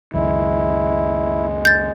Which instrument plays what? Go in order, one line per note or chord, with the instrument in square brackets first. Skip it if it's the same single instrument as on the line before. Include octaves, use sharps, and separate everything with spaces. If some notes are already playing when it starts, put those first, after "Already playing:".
[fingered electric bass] C#2 F#2 D#3 [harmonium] G#3 [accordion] E4
[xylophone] G6 A6